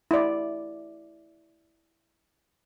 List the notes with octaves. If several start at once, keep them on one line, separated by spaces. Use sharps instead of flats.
E4 D5